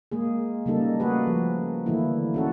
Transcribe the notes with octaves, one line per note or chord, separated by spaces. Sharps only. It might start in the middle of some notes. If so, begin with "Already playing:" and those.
G#3 A#3 G#4
C#3 G3 A#3 D#4 A4
A3 A#3 F#4 G#4 B4
F3
D3 E3 A3 A#3 E4
C#4 F#4 A4